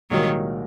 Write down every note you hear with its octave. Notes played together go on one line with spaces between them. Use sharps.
C2 A#2 D#3 F#3 G#3 D#4 A#4